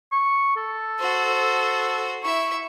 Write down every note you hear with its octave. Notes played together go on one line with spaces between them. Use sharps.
C#6
A4
F#4 C5
E4 E5 C#6